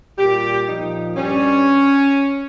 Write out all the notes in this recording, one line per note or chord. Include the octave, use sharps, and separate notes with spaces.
A#2 G3 G4
A#2 F3 D#4
G2 G3 C#4